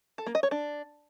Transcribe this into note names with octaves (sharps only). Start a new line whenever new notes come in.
A4
A#3
D#5
C#5
D4